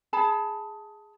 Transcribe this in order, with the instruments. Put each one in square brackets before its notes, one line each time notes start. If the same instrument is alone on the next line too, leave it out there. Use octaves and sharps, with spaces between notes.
[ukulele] G#4 A5 B5